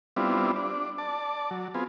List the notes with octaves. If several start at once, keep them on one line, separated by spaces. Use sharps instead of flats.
G3 B3 C4 D4 E4 F4
D4
D5 A5
F#3
B3 C4 F4 G#4